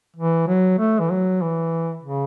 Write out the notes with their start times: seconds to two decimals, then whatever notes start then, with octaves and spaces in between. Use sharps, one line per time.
0.16 E3
0.48 F#3
0.79 A3
1.00 E3
1.10 F#3
1.42 E3
2.03 C#3